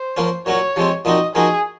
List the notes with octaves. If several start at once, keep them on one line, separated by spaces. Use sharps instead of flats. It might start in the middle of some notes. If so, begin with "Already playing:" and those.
Already playing: C5
F3 A#3 C#4
A#2 F#3 C#4 F#4 C#5
C3 F3 G#3 C4
A#2 F3 C4 D#4 F#4 D#5
F3 A#3 D#4 F#4 G#4